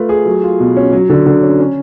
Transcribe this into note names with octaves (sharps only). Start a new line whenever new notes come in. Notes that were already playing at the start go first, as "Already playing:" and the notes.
Already playing: A3 F4 B4
G#4
F#3
F4
B2
C#4
F#3
D3
D3
C#4
C#4